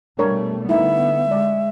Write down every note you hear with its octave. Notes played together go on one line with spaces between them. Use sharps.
B2 G3 A3 D4 A#4 C#5
D3 A3 B3 D#4 E4 E5
G#3 D5